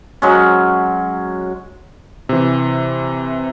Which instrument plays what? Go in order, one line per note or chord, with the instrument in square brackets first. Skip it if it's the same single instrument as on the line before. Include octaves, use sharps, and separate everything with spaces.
[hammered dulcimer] F#3 G#3 C#4
[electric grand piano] C3 E3